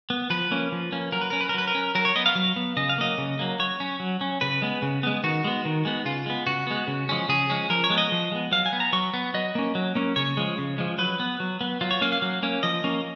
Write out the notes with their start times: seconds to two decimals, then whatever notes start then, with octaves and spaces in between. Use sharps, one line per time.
0.10 B3
0.30 F3 B4
0.51 A#3 C#4
0.72 F3
0.92 A#3 C#4
1.12 F#3 A#4
1.21 B4
1.30 C#4 A#4
1.41 B4
1.49 A#4
1.54 F#3 B4
1.67 A#4
1.75 C#4
1.95 F#3 A#4
2.05 C#5
2.16 B3 D#5
2.26 F5
2.35 F#3
2.56 B3
2.77 C#3 D#5
2.89 F5
2.98 F#3 A#3 D#5
3.18 C#3
3.39 F#3 A#3
3.59 F#3 C#5
3.80 C#4
4.00 F#3
4.21 C#4
4.41 C#3 B4
4.62 G#3 B3
4.82 C#3
5.03 G#3 B3
5.24 D#3 F#4
5.44 G#3 B3
5.65 D#3
5.85 G#3 B3
6.05 C#3 F4
6.26 G#3 B3
6.47 C#3 F#4
6.67 G#3 B3
6.87 C#3
7.09 F3 G#3 C#4
7.29 C#3 G#4
7.50 F3 G#3 C#4
7.70 F3 A#4
7.84 C#5
7.90 G#3 B3
7.98 D#5
8.12 F3
8.32 G#3 B3
8.52 F#3 F5
8.66 G#5
8.73 B3
8.80 A#5
8.93 F#3 C#6
9.14 B3
9.34 F#3 D#5
9.55 A#3 C#4
9.75 F#3
9.95 A#3 C#4
10.16 C#3 C#5
10.37 F3 G#3
10.58 C#3
10.78 F3 G#3
10.98 F#3 B4
11.20 B3
11.40 F#3
11.61 B3
11.81 F#3 F4
11.91 C#5
12.01 A#3 C#4 F5
12.12 F5
12.22 F#3
12.43 A#3 C#4
12.63 F3 D#5
12.84 A#3 C#4